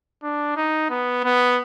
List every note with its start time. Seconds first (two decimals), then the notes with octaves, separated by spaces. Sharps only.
0.23 D4
0.56 D#4
0.90 B3
1.24 B3